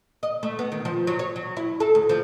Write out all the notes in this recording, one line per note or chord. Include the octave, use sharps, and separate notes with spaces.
D#5
A3
B3
D#3
F3
F#3
C#5
F#3
E4
A4
D2
F3